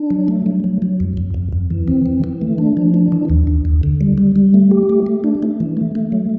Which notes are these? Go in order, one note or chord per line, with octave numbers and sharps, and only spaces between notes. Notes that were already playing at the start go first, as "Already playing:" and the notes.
Already playing: D4
F#3
A3
F#3
F#3
F#3
F2
F2
F2
F2
E3
C4
E3
E3
A3
D4
F3
D4
E3
D#2
D#2
D#2
D3
G3
G3
G3
A3
G4
A3
A3
D4
A3
E3
A3
A3
F#3